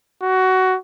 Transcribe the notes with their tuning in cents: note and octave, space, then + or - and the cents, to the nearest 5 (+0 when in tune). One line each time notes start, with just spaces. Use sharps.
F#4 +15